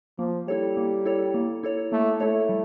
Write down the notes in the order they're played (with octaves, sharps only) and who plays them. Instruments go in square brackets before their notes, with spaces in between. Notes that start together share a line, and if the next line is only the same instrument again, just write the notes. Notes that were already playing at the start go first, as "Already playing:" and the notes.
[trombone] F3 [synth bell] A#3
[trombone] G3 [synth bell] E4 A4 C#5
[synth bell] A#3
E4 A4 C#5
A#3
E4 A4 C#5
[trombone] A3 [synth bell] A#3
[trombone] A3 [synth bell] E4 A4 C#5
[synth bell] G3